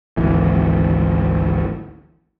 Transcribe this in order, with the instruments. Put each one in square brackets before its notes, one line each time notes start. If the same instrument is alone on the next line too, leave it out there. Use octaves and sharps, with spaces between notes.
[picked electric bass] G#1 D2 E3